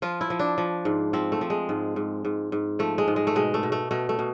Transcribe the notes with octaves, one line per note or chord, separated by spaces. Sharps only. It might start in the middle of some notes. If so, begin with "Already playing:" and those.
F3 F4
E4
F3
D4
F3
G#2
F3 C4
A3
F3
G#3
G#2
G#2
G#2
G#2
F3 A3
G#3
G#2
G#3
A3
B2 G#3
A3
B2
A3
B2 A3
A3
B2